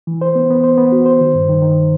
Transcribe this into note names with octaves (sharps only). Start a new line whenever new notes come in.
E3
C5
B3
B3
C5
B3
F#4
C5
D#3
G2
D#3
D#3